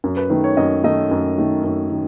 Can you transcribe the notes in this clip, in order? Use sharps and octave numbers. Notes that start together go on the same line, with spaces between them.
F#2
B4
D#3 A3 B4
C#5
F#2 D#5
D#3 A3 D#5
F#2
D#3 A3
F#2
D#3